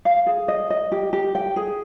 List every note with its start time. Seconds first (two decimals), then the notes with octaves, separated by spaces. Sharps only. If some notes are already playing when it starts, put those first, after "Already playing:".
0.05 F5
0.26 G#4
0.48 D#5
0.70 D#5
0.92 G4
1.13 G4
1.35 G5
1.56 G#4